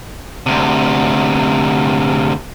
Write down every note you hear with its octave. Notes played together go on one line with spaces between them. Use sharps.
D2 C3